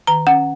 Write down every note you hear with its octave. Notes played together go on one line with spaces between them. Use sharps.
D#3 A#5
C#4 F#5